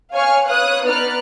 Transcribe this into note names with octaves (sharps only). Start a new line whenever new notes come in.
C#5 F5 G#5 C#6 F6
B4 C#5 F5 D#6 F#6
B3 D#4 B4 D5 F6 F#6